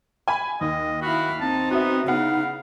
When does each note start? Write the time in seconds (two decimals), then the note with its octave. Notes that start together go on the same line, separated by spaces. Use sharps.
0.28 G#5 B5
0.61 D#2 D#5
1.02 E4 F#4 F5 B5
1.41 C4 D#4 A5
1.71 B3 F#4 E5
2.07 C#3 B3 D#4 E4 F5 F#5